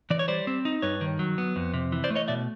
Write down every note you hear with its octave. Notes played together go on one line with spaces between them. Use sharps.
E3 D5
C#5
G3 C5 D5
C4
D#4
G2 B4 C#5
D#3
F#3
B3
F2
C3
E3
C5 D5
A3
C#5 D#5
B2 D5 E5